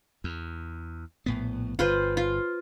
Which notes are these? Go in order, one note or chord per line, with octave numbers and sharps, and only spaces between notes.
E2
A#1 A2 B3
G1 F4 B4 C5
F4